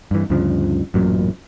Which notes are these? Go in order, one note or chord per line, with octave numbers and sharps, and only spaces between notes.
G2 E3
D2 G2 C#3 F3
A1 F#2 A#2 F#3